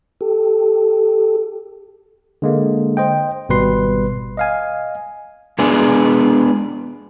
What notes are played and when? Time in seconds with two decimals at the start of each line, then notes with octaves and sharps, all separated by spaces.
0.21 G4 A4
2.42 D3 G#3 A#3
2.97 C5 D#5 G5
3.49 G#1 B2 G3 B4 C6 C7
4.37 D#5 F5 G#5
5.59 G#3 B3 D4 G#4